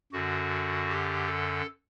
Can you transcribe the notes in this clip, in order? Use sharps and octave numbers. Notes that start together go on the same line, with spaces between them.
F#2 D3 F#4
G4
A4